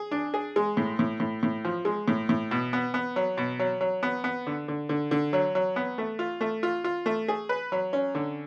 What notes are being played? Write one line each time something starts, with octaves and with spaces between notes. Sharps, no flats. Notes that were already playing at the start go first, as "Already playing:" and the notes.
Already playing: G#4
D4
G#4
G#3
A2
A2
A2
A2
F3
G#3
A2
A2
B2
B3
B3
F#3
B2
F#3
F#3
B3
B3
D3
D3
D3
D3
F#3
F#3
B3
A3
F4
A3
F4
F4
A3
G#4
B4
F#3
C#4
D3